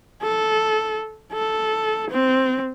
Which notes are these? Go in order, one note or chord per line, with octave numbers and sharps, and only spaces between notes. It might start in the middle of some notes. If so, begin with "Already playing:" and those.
A4
A4
C4